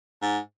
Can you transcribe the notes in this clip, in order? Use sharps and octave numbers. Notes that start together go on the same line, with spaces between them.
G#2